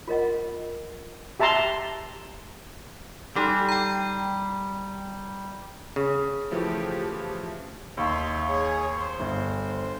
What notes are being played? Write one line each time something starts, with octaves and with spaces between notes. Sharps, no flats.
F4 A#4 D#5 F#5
G4 E5 A5 A#5 C6
G3 D#4 G4 A4
G5 A#5
C#3
E3 F3 A3 G4
D#2 D#4 E5 C6
G#4 C#5
C5
G1
C5